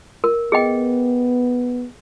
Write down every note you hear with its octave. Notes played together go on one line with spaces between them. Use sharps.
A#4
B3 G#4 D#5 G5